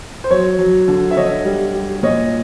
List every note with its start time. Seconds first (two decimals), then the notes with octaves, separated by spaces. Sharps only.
0.24 C5
0.30 F#3 C#5
0.59 F#3
0.88 D3
1.11 E5
1.17 D3 C#5 D#5
1.45 G3
1.75 G3
2.03 A#2 C#5 D#5